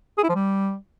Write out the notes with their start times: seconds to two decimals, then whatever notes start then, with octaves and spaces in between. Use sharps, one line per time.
0.18 G#4
0.23 E4
0.29 F3
0.35 G3